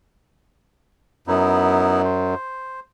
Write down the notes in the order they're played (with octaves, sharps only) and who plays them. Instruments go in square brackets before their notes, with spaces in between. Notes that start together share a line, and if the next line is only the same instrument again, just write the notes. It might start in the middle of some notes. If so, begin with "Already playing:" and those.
[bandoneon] F#2 [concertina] B3 D#4 E4
[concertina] C5